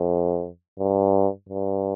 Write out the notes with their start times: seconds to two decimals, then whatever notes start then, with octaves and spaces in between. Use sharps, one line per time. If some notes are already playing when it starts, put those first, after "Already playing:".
Already playing: F2
0.79 G2
1.49 G2